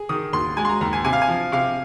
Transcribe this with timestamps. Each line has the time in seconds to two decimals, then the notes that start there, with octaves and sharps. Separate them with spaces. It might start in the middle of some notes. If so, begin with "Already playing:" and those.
Already playing: G#4
0.09 D#3 D#6
0.33 D#2 C6
0.57 G#3 G#5
0.65 C6
0.69 A#5
0.81 D#2 A#5
0.93 G#5
1.04 C3 G#5
1.13 F5
1.22 G#5
1.28 F3
1.52 C3 F5